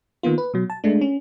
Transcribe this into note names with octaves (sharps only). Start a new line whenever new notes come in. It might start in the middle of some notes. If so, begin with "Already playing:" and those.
D#3 A#3 B3 F4
B4
B2 F#3
A5
G#3 A3 D4
C#4